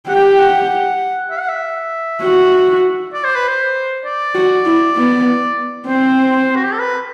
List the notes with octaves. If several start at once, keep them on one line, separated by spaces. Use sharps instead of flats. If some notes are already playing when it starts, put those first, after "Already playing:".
G4 F#5
G5
F#5
E5
F#5
E5
F#4
D5
C5
B4
C5
D5
F#4
E4
B3
C4 C5
F#4
G4
A4
B4